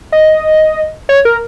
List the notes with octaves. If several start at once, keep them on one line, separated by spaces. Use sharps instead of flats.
D#5
C#5
A#4